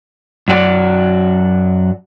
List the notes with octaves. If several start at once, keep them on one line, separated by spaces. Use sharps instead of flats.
F#2 F#3 F#4 D5